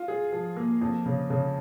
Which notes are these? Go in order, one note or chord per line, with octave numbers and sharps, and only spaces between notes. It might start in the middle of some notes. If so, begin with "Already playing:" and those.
Already playing: F4
G#4
F3
A#3
F2
C#3
C#3